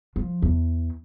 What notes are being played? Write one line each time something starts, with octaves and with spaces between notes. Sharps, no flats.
F3
E2